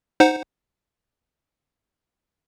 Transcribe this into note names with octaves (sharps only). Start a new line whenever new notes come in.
D#4 C5 F#5